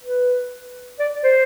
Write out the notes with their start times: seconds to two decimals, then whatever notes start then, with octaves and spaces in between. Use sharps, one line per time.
0.03 B4
0.99 D5
1.24 C5